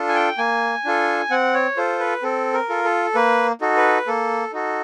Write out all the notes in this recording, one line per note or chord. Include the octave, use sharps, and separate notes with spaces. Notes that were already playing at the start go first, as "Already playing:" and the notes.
Already playing: D4 F4 A4
G#5
G5
A#3 G#5
D4 F4 A4
C4 F#5
C#5
F4 A4 C5
B4
C4 A4
A#4
F4 A4
A4
A#3 B4
D#4 F#4 A4
B4
A#3 A4
D#4 F#4 A4